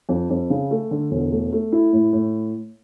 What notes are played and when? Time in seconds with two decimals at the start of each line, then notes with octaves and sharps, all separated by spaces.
0.09 F2
0.30 F2
0.50 C#3
0.71 A3
0.91 D3
1.11 E1
1.32 A3
1.52 A3
1.72 E4
1.93 A2
2.13 A2